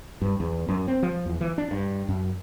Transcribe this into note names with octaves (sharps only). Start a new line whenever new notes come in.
G2
E2
F#2
C4
F3
E2
E3
D4
G2
F#2